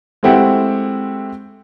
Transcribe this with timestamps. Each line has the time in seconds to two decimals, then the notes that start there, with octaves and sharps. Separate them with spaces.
0.23 G#3 A3 C4 E4 G4 F#5